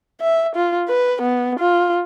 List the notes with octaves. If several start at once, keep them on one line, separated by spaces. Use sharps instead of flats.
E5
F4
B4
B3
F4